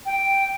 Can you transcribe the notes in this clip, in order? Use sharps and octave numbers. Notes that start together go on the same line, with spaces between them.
G5